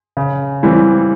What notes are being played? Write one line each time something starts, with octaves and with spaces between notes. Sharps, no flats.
C#3
E3 G3 C4